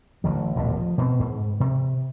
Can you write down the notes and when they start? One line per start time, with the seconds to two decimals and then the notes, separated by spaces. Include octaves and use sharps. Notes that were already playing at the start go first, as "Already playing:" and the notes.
0.24 A1 D3 F#3
0.56 D#1 A1 G2 B2
0.76 F3
0.98 B2 B3 C4
1.20 G#2
1.60 C3